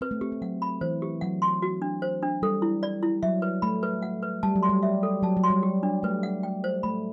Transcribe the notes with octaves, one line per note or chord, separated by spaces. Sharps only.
C4 B4
A3
C4 G4
C4
F#3 F#5
B5
E3 C5
G4
F#3 F#5
C6
F#4
D4
C5
D4
G3 A4
E4
D5
E4
F#3 E5
B4
A3 B5
B4
F#5
B4
G3 A5
F#3
C6
G3
E5
A4
F#3 A5
F#3
C6
G3
G4
D4
A3 B4
F#5
G5
C5
A3 B5